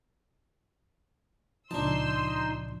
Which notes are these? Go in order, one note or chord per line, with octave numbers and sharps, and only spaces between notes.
C#2 A#2 F3 D4 D#4 A5 C6 E6